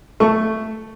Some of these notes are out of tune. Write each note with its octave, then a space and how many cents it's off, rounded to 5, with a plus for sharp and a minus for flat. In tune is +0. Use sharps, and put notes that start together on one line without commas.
A3 +0 C#6 +0